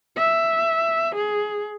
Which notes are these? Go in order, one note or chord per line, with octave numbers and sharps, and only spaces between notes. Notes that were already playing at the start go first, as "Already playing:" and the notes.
E5
G#4